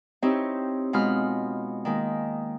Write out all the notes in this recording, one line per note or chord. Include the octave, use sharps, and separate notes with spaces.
C4 D#4 E4 G4 C#5
B2 G#3 F4 B5 F6
D#3 G#3 A#3